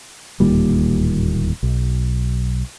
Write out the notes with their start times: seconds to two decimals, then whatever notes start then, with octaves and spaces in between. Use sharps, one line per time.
0.40 D1 D#2 A#2 G3
1.63 B1